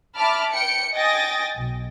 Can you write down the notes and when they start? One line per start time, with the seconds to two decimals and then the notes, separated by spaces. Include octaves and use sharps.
0.17 E5 A5 B5 D6 F6
0.53 G5 C#7
0.94 D#5 G5 G#5 D#6 A6 A#6
1.56 B1